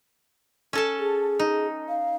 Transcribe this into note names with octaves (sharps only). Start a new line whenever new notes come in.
C#4 A4 A5
G#4
D#4
F5